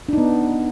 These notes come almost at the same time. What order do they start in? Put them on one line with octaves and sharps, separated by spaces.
D4 D#4 B3